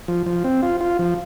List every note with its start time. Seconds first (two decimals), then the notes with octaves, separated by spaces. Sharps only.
0.08 F3
0.26 F3
0.44 C4
0.63 F4
0.81 F4
0.99 F3